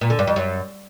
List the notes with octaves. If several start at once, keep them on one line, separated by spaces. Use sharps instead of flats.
A#2
D3
G2
F2
F#2